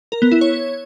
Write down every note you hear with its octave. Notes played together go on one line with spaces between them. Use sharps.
A#4
B3
E4
C#5